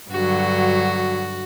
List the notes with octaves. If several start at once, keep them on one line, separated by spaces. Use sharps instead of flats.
G2 D3 F#3 F#4